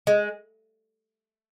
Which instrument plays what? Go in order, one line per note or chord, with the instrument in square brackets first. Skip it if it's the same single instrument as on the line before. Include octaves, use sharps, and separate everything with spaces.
[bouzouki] G#3